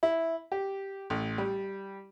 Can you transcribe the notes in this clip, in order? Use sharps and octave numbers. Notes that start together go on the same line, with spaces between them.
E4
G4
A1
G3